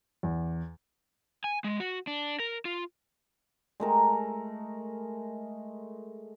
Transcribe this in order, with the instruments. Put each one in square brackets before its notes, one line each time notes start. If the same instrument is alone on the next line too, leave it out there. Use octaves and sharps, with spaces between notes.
[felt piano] E2
[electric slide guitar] G#5
G#3
F#4
D4
A#4
F4
[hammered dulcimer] G#3 A3 A#4